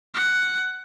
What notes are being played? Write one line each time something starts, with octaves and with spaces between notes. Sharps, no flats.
F#5